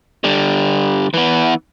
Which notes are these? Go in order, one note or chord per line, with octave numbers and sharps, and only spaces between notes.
D3 G3
E3 B3